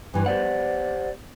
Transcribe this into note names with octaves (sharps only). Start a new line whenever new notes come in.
G2 E3 G#5
B3 G4 C5 D5 F#5